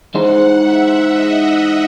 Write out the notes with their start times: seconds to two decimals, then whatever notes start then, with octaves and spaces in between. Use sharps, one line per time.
0.14 E3 G#3 D#4 G#4 C5 F#5
0.61 E5
1.07 D#5